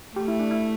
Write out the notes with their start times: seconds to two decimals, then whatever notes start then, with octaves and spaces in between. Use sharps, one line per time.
0.15 A3 G4
0.28 E4
0.39 D4
0.51 E4